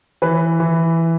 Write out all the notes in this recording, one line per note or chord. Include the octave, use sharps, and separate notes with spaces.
E3 B4
E3